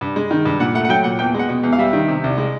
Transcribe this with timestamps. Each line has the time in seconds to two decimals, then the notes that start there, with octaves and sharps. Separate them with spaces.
0.01 G2
0.16 G#3
0.31 D#3
0.45 G2
0.60 A#2 F#5
0.74 A3 F#5
0.85 F#5
0.89 F#3 G5
1.04 A#2 F#5
1.19 E2 G5
1.34 G#3 F#5
1.49 B2
1.63 E2
1.73 F5
1.78 G3 E5
1.93 D#3
2.08 C3
2.24 C2
2.38 G#3